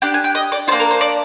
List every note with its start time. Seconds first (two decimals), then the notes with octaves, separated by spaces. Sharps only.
0.02 D4 G4 G5
0.14 G#5
0.24 G5
0.35 D#5
0.52 D5
0.68 A#3 D4 F4 C5
0.80 A#4
0.91 C5
1.01 D5